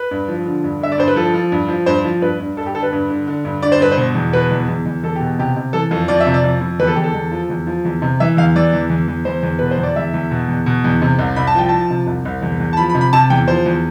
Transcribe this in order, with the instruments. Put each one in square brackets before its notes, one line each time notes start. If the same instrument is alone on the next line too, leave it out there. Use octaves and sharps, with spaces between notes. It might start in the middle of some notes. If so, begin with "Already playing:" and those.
Already playing: [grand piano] B4
G2
F3
D3
G2
D3 E5
D5
G2 C5
B4
F3 A4
F3
G2
F3
G2 C5
F3
G2 B4
G2
G2 A4
G4
D3 A4
B4
G2
D3
D3
G2
D3 D5
C5
G2 B4
C5
B2
E2
B2 B4
E2
E2
E2
E2 A4
B2 G4
C3 G4
C3
E3 A4
F2 A4
F2 D5
E5
C3
D5
F2
F2
E2 B4
A4
E2 G4
A4
E2
F3
E2
F3
E2
C3
E3 E5
E2 F5
E3 D5
E2
E2
E2
E2 C5
E2
B2 B4
C5
E2
D5
E2 E5
E2
B2
E2
B2
E2
C3
C2
C2 B5
A5
F3 G5
F3 A5
C3
C2
C2
E2
E2
A5
F3 B5
B5
C3
B5
C3 A5
E2 G5
F3 C5
E2